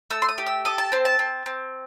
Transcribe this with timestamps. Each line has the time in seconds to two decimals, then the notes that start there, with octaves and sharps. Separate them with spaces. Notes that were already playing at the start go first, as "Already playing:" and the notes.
0.10 A3 E6
0.22 C6
0.29 D#6
0.38 G4
0.46 E6
0.65 A4 D#6
0.78 A5
0.92 C4 C5
1.05 A5
1.19 C4
1.46 C4